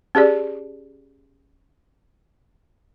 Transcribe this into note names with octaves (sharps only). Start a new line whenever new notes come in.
C#4 G4 G#4 D5